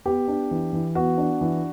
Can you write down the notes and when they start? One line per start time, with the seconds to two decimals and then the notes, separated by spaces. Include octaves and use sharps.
0.06 B3 G4
0.28 D4
0.51 E3
0.73 E3
0.95 B3 F#4
1.18 D4
1.41 E3